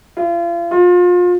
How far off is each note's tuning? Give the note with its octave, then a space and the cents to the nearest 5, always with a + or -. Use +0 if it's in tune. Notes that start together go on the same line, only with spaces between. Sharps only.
F4 -40
F4 +30